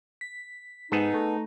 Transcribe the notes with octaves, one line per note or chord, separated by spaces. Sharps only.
B6
G#2 B3 D#4 G#4 A4
A3